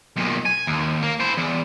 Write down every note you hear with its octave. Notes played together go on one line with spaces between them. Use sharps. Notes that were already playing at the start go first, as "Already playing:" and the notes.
B1 A#2
G#5
D#2
A#3
E4 C5
E2